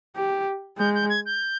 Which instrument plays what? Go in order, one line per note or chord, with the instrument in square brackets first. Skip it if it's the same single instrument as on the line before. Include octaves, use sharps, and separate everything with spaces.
[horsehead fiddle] G4
[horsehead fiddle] G#3 [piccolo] G6
[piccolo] G6
G#6
G6